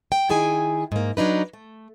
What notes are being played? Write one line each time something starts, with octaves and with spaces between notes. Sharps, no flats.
G5
D#3 E4 G#4 G5 G#5
G#2 A#3
F#3 D4 D#4 B4
A3